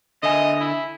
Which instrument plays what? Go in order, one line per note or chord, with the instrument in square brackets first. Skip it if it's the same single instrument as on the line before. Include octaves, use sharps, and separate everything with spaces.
[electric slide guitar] D3 E5 G#5 [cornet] D#5
[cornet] E4